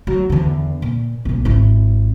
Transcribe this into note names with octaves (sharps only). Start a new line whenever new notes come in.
F#3
E2 D3
A#2
B1 A#2
G#1 E4